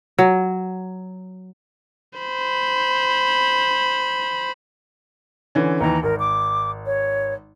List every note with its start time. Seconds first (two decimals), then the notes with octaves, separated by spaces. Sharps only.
0.18 F#3
2.19 C5 B5
5.55 D3 E3 C#4
5.80 D#2 D#3 E3 A#5
6.03 G#1 A#4
6.19 D6
6.86 C#5